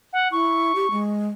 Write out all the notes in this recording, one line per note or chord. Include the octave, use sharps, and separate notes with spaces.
F#5
E4 C#6
G4
G#3